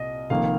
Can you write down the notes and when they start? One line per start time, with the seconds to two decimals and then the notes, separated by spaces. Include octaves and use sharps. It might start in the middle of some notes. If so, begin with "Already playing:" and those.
Already playing: C2 A#2 D#5
0.30 F1 F2 D#3 A#3 F5